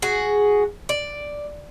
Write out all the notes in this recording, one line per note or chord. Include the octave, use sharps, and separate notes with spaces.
F#4 G#4
D5